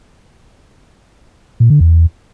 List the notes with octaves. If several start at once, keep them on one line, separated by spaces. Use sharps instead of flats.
A#2
D3
E2